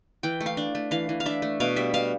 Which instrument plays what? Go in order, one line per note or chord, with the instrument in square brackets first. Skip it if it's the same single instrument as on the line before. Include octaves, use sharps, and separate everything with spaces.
[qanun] E3 G5
A3
F5
D4
A3
E3 F5
E3
F5
D4 E5
A3
B2 F5
G3 E5
B2 F5